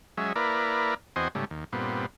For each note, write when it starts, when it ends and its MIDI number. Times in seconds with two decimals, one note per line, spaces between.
0.17 0.33 54
0.17 0.33 56
0.17 0.33 61
0.17 0.33 76
0.36 0.94 58
0.36 0.94 64
0.36 0.94 70
0.36 0.94 71
0.36 0.94 74
1.16 1.28 40
1.16 1.28 60
1.16 1.28 66
1.16 1.28 72
1.16 1.28 75
1.16 1.28 80
1.35 1.45 44
1.35 1.45 49
1.35 1.45 55
1.35 1.45 57
1.50 1.64 39
1.73 2.06 43
1.73 2.06 46
1.73 2.06 59
1.73 2.06 60